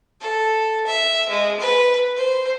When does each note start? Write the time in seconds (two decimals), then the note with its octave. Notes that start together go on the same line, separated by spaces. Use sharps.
0.21 A4
0.87 E5
1.29 G#3
1.60 B4
2.16 C5